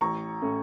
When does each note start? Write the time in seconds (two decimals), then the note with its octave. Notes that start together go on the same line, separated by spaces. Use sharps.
0.01 A1 A#5 C#6
0.42 A2 A3 C#4